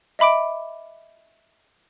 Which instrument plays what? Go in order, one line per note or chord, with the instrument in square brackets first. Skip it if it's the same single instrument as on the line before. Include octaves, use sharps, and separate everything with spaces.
[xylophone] D#5 E5 B5 D6 D7